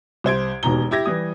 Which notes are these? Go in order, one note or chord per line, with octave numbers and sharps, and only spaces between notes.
C2 C5 G#6 D7
E1 D#2 B2 A#5 G7
E4 G4 G#6 A#6
E3 G3 D#6